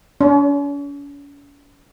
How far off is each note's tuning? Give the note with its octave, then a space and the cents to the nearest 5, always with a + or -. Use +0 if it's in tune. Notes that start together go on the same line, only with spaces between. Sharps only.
C#4 +45